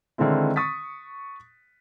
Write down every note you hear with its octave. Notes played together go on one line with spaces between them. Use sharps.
D3 D#3 G#3 C4 E4
C#6 D#6 A6 B6